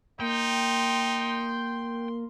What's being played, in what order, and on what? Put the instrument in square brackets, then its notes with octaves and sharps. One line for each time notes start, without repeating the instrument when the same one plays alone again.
[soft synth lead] A#3 [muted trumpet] D#4 [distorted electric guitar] G5 [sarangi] C6